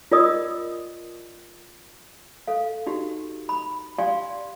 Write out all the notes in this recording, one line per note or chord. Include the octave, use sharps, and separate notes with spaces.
F4 A#4 D5 D#5 D#6 E6
A4 F5
D#4 F#4 G4
B5
G4 D5 F5 G#5 C6